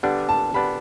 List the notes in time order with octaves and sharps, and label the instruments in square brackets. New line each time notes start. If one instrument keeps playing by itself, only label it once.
[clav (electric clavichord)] D3 G3 B3 D4 [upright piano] F#5
[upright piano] A5
[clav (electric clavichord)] D3 G3 B3 D4 [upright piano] B5